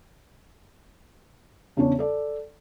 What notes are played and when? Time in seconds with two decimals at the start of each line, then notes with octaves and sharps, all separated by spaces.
1.77 E2 C#3 D4 C#5
1.99 A4 D5